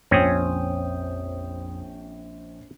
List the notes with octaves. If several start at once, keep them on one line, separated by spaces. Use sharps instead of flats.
A#1 F2 C4 C#4 C#5 G5 G#5 D#6